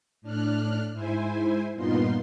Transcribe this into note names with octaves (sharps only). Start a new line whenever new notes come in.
A2 D4 F6 F#6
G#2 E4 C5 G#5
G2 A#2 B3 D#4 F4 C6